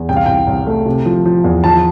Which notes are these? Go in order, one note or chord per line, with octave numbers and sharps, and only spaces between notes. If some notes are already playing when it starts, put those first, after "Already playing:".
Already playing: E2
C2 G5
F5
C2 G5
C2
A3
C3
F3
F3
E2
F3 A5